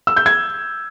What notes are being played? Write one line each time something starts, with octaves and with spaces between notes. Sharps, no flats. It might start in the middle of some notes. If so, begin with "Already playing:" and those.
E6
G6
G#6